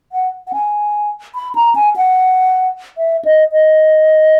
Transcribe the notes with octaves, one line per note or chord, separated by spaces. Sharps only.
F#5
F#5
G#5
B5
A#5
G#5
F#5
E5
D#5
D#5